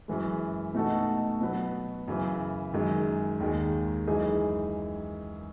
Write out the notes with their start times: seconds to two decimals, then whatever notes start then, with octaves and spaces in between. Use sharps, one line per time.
0.08 F#2 E3 G#3
0.75 B2 A3 D#4 F#4 A4
1.41 B2 F#3 B3
2.08 F#2 C#3 E3
2.74 F#2 D#3 G#3
3.40 D#2 D#3 G#3
4.07 F#2 E3 G#3 D#4 G#4